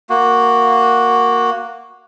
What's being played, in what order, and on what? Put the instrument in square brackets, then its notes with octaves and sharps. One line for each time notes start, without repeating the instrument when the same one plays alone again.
[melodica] A#3 F#4